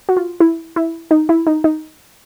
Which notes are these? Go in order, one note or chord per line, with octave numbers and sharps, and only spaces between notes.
F#4
F4
E4
E4
D#4
E4
D#4
D#4